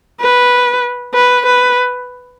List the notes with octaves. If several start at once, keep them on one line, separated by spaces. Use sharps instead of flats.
B4
B4
B4